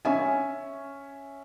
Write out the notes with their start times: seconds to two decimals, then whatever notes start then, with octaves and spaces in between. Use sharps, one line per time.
0.05 C#4 E5 G#5